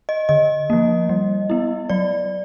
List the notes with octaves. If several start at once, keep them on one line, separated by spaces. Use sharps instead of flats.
D#5
D3 D#5
F3 A#3
G3
B3 E4
F#3 D5